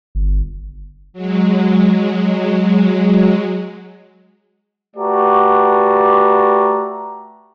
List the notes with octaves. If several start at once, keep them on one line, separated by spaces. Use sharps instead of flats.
G1
F#3 G#3
A3 F#4 G4 B4 D5 A#5